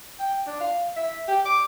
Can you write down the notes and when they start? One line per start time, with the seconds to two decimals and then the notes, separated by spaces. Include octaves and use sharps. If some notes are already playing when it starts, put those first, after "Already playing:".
0.19 G5
0.47 D4
0.60 F5
0.96 E5
1.28 G4
1.45 D6